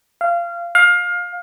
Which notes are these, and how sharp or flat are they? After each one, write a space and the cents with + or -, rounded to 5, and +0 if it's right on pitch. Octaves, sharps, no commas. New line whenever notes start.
F5 -20
F5 +25